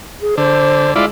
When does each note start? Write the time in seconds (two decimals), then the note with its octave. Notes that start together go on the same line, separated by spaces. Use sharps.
0.21 G#4
0.37 D3 C5
0.96 G#3 E4 F4 D5